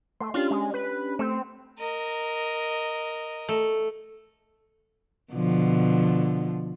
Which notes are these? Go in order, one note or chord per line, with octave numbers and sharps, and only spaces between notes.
A3 C6
C#4 D4 F4 G4
G#3
B4
A3 C4
A#4 D#5
A3
B2 D3 F3